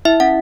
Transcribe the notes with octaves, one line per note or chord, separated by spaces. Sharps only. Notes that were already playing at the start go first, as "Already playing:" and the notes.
E4 E5
C#4 F#5